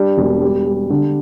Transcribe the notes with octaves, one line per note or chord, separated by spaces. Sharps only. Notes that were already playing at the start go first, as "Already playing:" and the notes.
Already playing: G3 D4
E1
G3
G3
D3